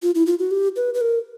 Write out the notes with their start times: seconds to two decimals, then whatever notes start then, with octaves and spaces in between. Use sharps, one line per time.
0.02 F4
0.15 E4
0.26 F4
0.39 F#4
0.51 G4
0.76 B4
0.94 B4
1.01 A#4